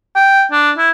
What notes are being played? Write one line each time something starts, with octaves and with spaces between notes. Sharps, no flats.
G5
D4
E4